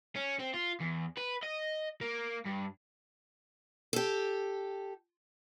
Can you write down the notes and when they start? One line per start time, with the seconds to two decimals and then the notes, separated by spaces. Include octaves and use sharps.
0.16 C#4
0.39 C4
0.54 F4
0.80 E2
1.17 B4
1.43 D#5
2.01 A#3
2.46 G2
3.93 G4 A4